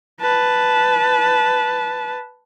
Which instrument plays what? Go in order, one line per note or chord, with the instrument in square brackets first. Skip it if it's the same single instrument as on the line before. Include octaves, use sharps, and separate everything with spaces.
[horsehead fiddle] B4 A5